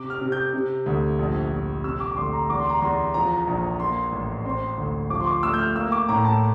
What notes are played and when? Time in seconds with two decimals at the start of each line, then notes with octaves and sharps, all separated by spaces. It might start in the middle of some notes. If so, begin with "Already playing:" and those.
Already playing: C3 D6
0.10 F6
0.21 C3
0.32 G6
0.54 C3
0.86 D2
1.19 A#1
1.52 A#1
1.84 C3 E6
2.00 D6
2.11 D6
2.17 D2 C6
2.33 A#5
2.49 E2 D6
2.59 C6
2.69 A#5
2.79 E2 C6
3.14 F3 A#5
3.47 A#1
3.80 A#3 C6
4.12 A1
4.45 C4 C6
4.77 D2
5.10 F3 D6
5.20 C6
5.26 D6
5.43 A3 E6
5.54 G6
5.59 F6
5.75 A#3 E6
5.92 D6
6.09 A2 A#5
6.25 A5